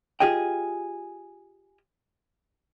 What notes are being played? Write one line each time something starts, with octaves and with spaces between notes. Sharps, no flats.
F4 G4 G#4 D#5 G5